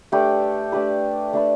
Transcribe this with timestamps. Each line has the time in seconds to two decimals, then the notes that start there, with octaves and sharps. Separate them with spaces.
0.12 A3 D4 G4 B4
0.72 A3 D4 G4 B4
1.33 A3 D4 G4 B4